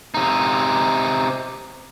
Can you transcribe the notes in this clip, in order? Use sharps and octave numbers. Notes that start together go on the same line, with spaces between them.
C3 D#4